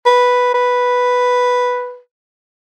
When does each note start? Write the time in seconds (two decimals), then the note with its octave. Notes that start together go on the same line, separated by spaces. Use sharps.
0.06 B4
0.54 B4